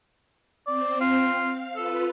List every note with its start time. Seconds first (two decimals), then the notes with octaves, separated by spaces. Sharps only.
0.67 C4 D5
1.01 F4
1.43 F5
1.76 F4 A4 B4